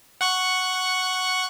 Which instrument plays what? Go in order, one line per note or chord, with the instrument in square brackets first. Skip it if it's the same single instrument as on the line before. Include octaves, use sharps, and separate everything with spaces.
[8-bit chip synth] F#5 C#6 F#6